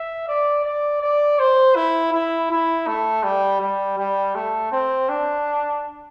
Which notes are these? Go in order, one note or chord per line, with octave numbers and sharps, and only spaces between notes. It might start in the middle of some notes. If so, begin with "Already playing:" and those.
Already playing: E5
D5
D5
D5
C5
E4
E4
E4
A3
G3
G3
G3
A3
C4
D4